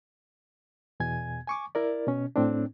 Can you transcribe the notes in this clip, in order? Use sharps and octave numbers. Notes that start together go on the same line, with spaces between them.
E2 B2 G#5 G#6
G#5 C#6 D6
E4 A#4 D5
B2 C#4
A2 C4 D4